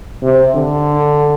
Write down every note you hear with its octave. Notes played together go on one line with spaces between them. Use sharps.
C3
D3